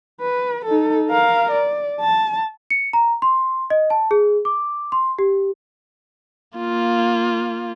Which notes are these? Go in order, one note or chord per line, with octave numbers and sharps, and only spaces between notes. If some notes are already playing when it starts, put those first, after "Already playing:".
B4
D#4 A4
A#4 F5
D5
A5
C#7
A#5
C6
D#5
A5
G#4
D6
C6
G4
A#3 F4